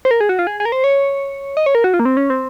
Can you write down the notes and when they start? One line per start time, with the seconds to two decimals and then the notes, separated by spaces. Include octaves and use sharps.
0.05 C5
0.11 A#4
0.21 G#4
0.29 F#4
0.39 F4
0.47 G#4
0.60 G#4
0.65 A#4
0.72 C5
0.84 C#5
1.57 D#5
1.66 C#5
1.75 A#4
1.84 F#4
1.94 F4
2.00 A#3
2.05 C4
2.17 C#4
2.30 C4